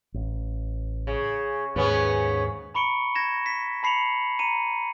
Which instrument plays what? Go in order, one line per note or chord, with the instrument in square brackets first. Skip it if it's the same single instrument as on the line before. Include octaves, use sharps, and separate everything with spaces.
[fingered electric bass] A1
[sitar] C#3
[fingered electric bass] D#2 G#2 [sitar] C#3 B3 C#4
[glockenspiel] A#5 B5 C#6 C#7 D7 G7
G#6 A#6 E7
B6
A5 B5 C7 C#7 F7 F#7
A#5 C#7 D#7